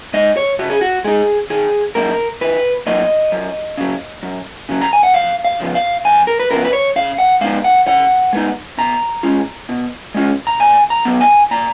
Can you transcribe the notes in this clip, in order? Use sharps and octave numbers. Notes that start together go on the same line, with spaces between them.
G#3 D#4 D#5
C#5
C#3 F#4
G#4
F#4
G#3 D#4 G#4
D#3 G#4
F#3 A#3 D#4 A#4
D#3 B4
F#3 A#3 D#4 D#5
F#2
C#3 F#3
F#2
C#3 F#3
A#5
G#5
F#5
F2 F5
F5
C#3 F3 B3
F5
F2 G#5
A#4
B4
C#3 F3 B3 A#4
B4
C#5
C#3 F5
F#5
G#3 B3 D#4 F5
F#5
C#3 F#5
G#3 B3 D#4
B2 A#5
G#3 C#4 F4
B2
G#3 C#4 F4
A#5
A#2 G#5
A#5
F#3 B3
G#5
A#2 A#5